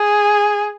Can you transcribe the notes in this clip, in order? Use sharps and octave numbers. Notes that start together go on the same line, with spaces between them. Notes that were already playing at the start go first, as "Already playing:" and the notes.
Already playing: G#4